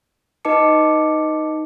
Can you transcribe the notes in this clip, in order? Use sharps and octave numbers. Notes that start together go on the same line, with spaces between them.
D#4 B4 D#5 A5 D6 C#7